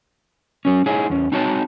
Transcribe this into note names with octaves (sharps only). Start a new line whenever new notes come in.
F#3 C#4
D#4 E4 G#4 C#5
E2 C#4
C4 D#4 F#4 C#5 A5